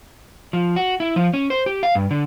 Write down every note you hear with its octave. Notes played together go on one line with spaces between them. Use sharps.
F3
F#4
E4
F3
C#4
C5
G4
F5
G2
D3